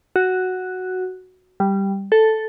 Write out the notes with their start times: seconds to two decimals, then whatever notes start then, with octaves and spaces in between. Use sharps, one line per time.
0.16 F#4
1.60 G3
2.12 A4